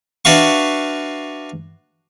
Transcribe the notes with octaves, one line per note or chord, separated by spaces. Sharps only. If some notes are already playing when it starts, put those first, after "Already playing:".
D4 F#4 B4 E5 F5 C#6